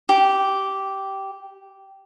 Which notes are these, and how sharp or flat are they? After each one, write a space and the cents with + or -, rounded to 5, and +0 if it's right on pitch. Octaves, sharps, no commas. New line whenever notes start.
G4 -10